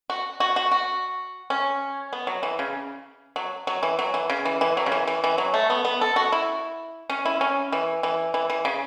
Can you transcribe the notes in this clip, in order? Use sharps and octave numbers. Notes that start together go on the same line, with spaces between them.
F#4
F#4
F#4
F#4
C#4
B3
F#3
E3
C#3
F#3
F#3
E3
F#3
E3
C#3
E3
E3
F#3
C#3
E3
E3
E3
F#3
A3
B3
B3
A4
F#4
E4
C#4
E4
C#4
E3
E3
E3
E3
C#3